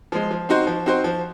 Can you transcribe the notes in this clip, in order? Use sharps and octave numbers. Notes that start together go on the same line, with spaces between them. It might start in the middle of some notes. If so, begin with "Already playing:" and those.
F3 G#3
F3
C4 D#4 F#4 C5
F3
C4 D#4 F#4 C5
F3